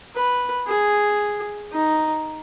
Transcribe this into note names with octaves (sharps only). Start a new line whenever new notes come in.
B4
G#4
D#4